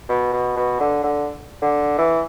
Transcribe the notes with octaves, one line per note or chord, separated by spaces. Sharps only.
B2
B2
B2
D3
D3
D3
E3